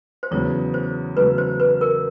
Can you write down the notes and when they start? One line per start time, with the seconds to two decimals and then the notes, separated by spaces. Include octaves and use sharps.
0.23 C5
0.31 E2 C#3 F#3 A3 C#5
0.74 C5
1.17 E2 C#3 F#3 A3 B4
1.38 C5
1.60 B4
1.81 A#4